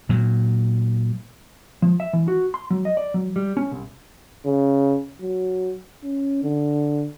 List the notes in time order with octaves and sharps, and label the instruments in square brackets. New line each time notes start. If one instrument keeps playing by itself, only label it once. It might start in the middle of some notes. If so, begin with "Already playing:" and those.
[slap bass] A#2 F#3
[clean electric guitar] F3
E5
E3
F#4
C6
F#3
D#5
D5
F#3
G3
C#4
C2
[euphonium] C#3
F#3
C#4
D3